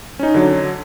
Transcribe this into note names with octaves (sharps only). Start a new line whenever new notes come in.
C#4 D#4
D3 F#3